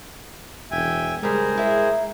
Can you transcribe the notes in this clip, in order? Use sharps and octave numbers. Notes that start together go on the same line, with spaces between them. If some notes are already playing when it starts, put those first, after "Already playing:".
E1 E5 G5 G#5
C#3 G3 G#3 G#4 A#4 C5
E4 E5